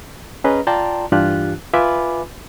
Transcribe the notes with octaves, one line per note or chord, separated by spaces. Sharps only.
C#4 G#4 B4 D#5 A#5
F4 D5 G5 A5 A#5 C6
G2 E3 D4 F4 G4 F#6
F4 B4 E5 G#5 B5 D6